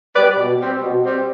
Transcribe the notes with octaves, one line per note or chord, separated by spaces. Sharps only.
G3 B3 B4 D5
B2
G3 C4
B2
G3 C4